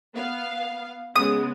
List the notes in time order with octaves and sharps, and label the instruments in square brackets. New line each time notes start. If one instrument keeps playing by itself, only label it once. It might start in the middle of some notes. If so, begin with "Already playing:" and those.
[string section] B3 F5
[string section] C#3 G#3 B3 [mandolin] D#6